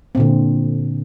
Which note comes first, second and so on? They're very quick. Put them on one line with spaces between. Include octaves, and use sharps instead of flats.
C4 A#2 D3